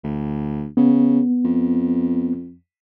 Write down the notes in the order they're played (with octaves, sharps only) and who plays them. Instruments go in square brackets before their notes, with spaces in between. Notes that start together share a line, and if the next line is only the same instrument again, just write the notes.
[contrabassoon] D2
[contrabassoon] C#3 [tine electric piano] B3
[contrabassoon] F2